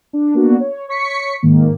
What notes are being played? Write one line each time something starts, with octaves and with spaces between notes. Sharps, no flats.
D4
A#3 B3 D4 F#4
C#5
C#5 C#6 B6 C#7
G#2 D#3 A#3